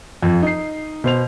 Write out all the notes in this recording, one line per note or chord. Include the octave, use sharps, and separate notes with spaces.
F2
D#4 C7
B2 C5 F7